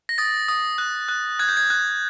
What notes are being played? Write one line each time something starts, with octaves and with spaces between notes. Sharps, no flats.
A#6
D#6 A6
D#6
F#6
F#6
F#6 G#6
G6
G#6
F#6